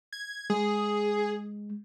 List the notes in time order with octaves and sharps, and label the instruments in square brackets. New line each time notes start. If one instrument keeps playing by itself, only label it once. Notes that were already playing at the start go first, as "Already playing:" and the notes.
[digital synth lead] G#6
[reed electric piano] G#3 [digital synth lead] G#4